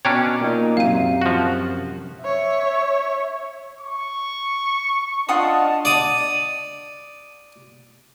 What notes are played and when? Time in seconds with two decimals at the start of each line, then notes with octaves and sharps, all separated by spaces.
0.05 B2 C#4 D4 C#5 G5 A#5 D6
0.41 A#2 D#4
0.77 F#2 C3 F5 D#7
1.21 F3 F#4
2.22 C#5 E5
3.81 C#6
5.29 D4 F4 D#5 F#5 A5 D#6
5.85 D5 D#6